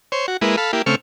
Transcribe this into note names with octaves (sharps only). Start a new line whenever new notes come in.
C5 C#5
F#4
G#3 A#3 E4 B4
A4 F5 B5
A#3 E4 G4
C#3 A3 C4 C#6 F6